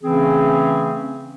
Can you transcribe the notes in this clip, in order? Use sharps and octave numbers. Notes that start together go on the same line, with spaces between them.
C#3 E3 A3 C4 C#4 G#4